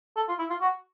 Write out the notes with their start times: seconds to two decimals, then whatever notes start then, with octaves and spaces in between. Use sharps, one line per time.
0.17 A4
0.29 F4
0.39 E4
0.50 F4
0.61 F#4